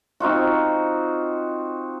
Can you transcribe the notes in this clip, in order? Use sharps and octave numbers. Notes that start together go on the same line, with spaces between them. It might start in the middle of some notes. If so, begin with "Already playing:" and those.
C4 D#4 F4 F#4